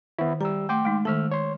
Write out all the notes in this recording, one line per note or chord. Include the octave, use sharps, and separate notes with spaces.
D#3 B3 E4
G3 A#5 E6
A3 F#5 G5 C6 D6
G#3 D#4
D#3 A3 A5 E6 F6
C#5 C6